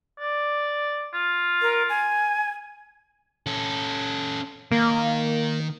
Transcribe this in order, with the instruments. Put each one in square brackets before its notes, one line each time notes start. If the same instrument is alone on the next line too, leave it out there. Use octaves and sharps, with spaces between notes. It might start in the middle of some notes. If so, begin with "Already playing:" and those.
[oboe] D5
F4
[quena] A#4
G#5
[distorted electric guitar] C#4 A4
[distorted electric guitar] D#3 A#4 [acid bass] A#3